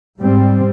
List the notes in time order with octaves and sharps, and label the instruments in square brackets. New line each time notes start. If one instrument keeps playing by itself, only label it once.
[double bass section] G#2 G3 C4